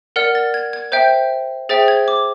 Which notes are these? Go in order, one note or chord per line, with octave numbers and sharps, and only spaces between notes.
A#4 D5 F#5 F6
A6
G#6
G#6
C5 E5 G5 G6
G#4 C5 E5 G5 A6
G#6
D6